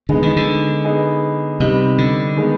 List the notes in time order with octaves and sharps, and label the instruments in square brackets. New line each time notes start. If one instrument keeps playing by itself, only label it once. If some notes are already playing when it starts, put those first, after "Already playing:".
[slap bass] D3 [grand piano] G#3 B3 D#4
[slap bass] D#3
D3
[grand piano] B3 D#4 G#4
[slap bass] C3 [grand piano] G3 B3 D#4
[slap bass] D3
[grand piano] D#3 G#3 B3